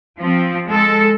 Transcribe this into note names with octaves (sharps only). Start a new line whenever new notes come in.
F3 C4
G#3 A4